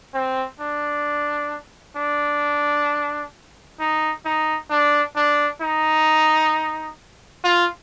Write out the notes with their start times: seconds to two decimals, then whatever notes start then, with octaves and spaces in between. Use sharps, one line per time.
0.14 C4
0.60 D4
1.96 D4
3.80 D#4
4.25 D#4
4.70 D4
5.16 D4
5.62 D#4
7.44 F4